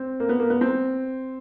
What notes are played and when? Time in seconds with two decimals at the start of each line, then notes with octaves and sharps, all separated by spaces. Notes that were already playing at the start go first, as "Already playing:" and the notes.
Already playing: C4
0.20 A#3
0.29 B3
0.39 A#3
0.50 B3
0.61 C4